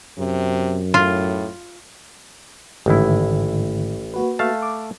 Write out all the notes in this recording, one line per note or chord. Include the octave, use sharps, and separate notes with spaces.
F#2 C3
A2 F4
A1 G#2 D3 D#3 E4
A#3 F#4 B4
A3 F5 A5
D6